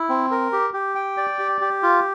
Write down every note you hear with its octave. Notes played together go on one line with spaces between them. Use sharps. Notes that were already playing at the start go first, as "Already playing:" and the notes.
Already playing: E4
C4
A#4
G4
G4
G5
D5
G4
G4
F4